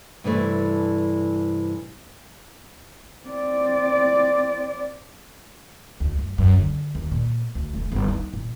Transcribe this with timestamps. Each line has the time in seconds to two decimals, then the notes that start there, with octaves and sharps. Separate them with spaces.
0.24 G2 C3 E3 A3
3.27 C4 D5
6.00 D2
6.18 F#2
6.38 F#2
6.58 D3
6.95 D#2
7.11 A#2
7.55 D2
7.74 F1
7.92 G1
8.08 D#4
8.33 A#2